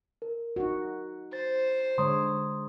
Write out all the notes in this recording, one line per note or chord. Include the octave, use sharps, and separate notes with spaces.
A#4
D#4 F#4
C5 A6
D3 G#3 C#5 A#5 C6 D#6